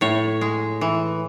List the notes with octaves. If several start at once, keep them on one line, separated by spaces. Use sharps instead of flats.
A2 C#5
G#3
E3